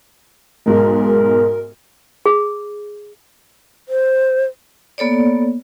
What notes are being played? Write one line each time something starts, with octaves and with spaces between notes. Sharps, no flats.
B1 G#2 G#3 A#4
G#4
C5
A#3 B3 A4 C#5 D5